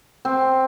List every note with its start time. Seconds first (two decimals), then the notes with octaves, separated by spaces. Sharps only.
0.25 C4